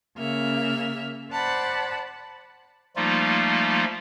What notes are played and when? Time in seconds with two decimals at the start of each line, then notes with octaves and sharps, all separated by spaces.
0.16 C#3 A#3 E5 F6
1.30 C5 D5 F#5 A5 B5
2.96 F3 G3 A3 A#3 D#4 F4